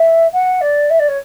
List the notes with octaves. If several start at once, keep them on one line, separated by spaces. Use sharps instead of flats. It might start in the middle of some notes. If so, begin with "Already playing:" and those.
Already playing: E5
F#5
D5
E5
D5
C#5